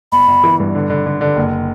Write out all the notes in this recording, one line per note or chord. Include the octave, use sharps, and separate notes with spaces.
G1 B5
G1
E3
G2
D3
D3
D3
D3
F#1